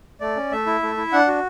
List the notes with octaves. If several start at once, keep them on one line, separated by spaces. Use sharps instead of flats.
A3 D5
C#4
A3 E5
E4
A3
E4
D4 F#5
F#4